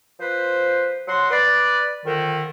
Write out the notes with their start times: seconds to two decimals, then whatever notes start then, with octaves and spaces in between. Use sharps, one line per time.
0.19 F3 B4 C5
1.07 F#3 F#4 F#5 C6
1.30 B4 D5
2.04 F2 D3 D#3